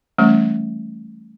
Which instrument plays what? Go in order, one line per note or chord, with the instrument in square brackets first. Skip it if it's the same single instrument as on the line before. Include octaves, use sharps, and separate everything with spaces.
[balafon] E3 G3 A3 C#4